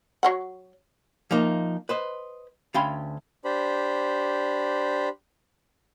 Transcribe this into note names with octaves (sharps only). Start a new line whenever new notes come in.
F#3 C#5 F#5
F3 A#3 D#4
B4 C5 D#5
D2 C#4 F5 G5 B5 C6
D4 G4 C5 B5